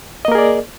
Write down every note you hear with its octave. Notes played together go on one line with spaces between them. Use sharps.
A#3 G#4 A#4 D5 D#5